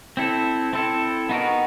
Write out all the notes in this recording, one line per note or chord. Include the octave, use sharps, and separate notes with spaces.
C4 E4 A4
C4 E4 A4
B3 D#4 F#4 A#4